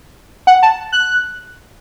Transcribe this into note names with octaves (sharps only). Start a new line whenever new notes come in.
F#5
A5
F#6